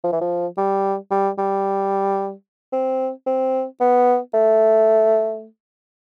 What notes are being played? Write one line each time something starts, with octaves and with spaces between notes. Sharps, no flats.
F3
E3
F3
G3
G3
G3
C4
C4
B3
A3